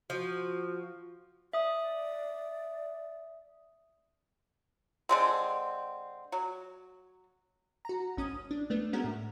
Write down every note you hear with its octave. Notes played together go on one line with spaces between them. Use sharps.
F3 F#4
D5 E5 D#6
D3 G#3 C4
F#3
F#4 A#5
G#1 C#4 D#6
D4
A3 B3 D4
G#3 A3 B3 C#4 F#4 A#4
A2